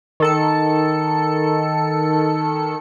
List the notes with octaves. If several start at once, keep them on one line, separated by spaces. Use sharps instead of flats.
D#3 A4 C#7